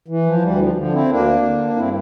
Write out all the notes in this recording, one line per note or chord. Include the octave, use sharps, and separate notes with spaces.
E3
F3
D2 E3 G3
F3
D3 F3
C4 E4
D2 A#3 D4
D3
G2 C4 E4